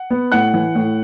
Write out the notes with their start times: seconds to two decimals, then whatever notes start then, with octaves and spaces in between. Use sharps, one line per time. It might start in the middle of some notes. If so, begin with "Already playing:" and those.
Already playing: F#5
0.10 B3
0.32 A2 F#5 F#6
0.54 E3
0.75 A2